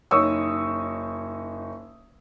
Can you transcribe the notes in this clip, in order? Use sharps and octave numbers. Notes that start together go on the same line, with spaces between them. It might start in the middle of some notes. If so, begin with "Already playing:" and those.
F#1 D#4 C#5 C#6 D#6 E6